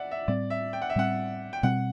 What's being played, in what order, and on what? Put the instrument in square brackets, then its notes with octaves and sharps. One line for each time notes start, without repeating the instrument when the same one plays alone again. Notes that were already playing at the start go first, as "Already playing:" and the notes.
Already playing: [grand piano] D5 E5 F#5
E5
[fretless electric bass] A2 G3 C4 [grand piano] D5
[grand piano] E5
G5
F#5
E5
[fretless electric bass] A2 G3 C4 [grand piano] F#5
[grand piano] G5
[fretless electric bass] B2 G3 C4 [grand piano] F#5